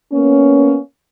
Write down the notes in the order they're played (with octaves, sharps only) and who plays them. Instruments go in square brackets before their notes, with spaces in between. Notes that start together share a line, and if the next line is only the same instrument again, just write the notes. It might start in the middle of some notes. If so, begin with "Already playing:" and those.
[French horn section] A#3 B3 C#4